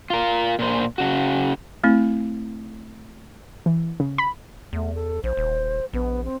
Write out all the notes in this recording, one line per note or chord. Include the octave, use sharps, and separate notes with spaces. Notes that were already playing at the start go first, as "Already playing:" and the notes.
F4 A#4
A#2 C5
C#3 F#4
A3 C4 E4
E3
C#3
B5
E2 A3
A4
A#1 C5
D#1
A#1 B3
C4